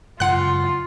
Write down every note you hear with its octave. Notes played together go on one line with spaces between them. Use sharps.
F#2 C#3 G#3 F4 F#5 F#6